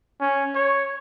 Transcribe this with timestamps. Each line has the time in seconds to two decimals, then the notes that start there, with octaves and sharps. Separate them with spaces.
0.21 C#4
0.55 C#5